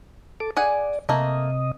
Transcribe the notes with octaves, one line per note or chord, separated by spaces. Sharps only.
A4 D6
G#4 D5 F#5 G#5
C3 A3 A#3 D#5